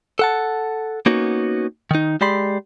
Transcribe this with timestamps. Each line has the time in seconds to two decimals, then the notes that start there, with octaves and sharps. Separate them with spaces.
0.19 A4 F#5 A5
1.06 A#3 B3 C#4 D#4 F#4
1.91 D#3 D#4
2.21 G#3 G4 D5 B5 C6